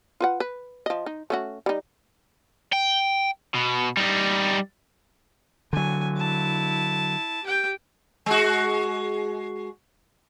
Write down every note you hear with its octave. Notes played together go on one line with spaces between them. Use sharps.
F4 B4 F#5
B4
F3 D#5
D#4
A3 C#4 F#4
G3 D#4
G5
B2
G3 D#4
D3 F#3 G#5
E4 A5
G4 G5
G#3 F#4